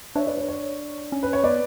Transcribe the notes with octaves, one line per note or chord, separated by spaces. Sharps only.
D4 C#5 E5
B4 D5
C#5
C#5
C#4
B4
C#5
B3 B4 D5